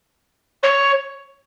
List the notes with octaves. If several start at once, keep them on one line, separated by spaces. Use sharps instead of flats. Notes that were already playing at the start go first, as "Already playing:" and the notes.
C#5